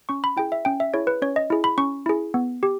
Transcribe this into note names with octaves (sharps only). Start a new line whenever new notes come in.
C#4 C#6
B5
E4 G#4 G5
E5
C#4 G5
E5
E4 G#4 C#5
B4
C#4 C#5
D#5
E4 G#4
B5
C#4 C#6
E4 G#4
B3
G4